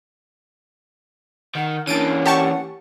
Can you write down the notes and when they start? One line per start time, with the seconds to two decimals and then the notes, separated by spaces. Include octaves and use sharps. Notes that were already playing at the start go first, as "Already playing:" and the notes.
1.55 D#3 F#5
1.87 E3 A#3 C#4 D4 A6 D7 D#7
2.26 G4 F#5 A5 C#6